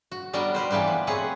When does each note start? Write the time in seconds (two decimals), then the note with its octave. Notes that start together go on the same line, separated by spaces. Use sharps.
0.12 F#4
0.33 G3 B3 D4 F#4 A#4 D#5
0.54 G3 B4 C5
0.70 E3 A#3 B3 D4 G4
0.87 F3
1.07 A3 C4 G#4 B4 C#5 F#5